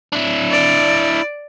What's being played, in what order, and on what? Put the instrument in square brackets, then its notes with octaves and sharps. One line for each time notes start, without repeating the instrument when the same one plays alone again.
[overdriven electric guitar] D4 E4
[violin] D5